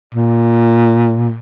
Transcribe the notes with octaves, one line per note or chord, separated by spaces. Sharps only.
A#2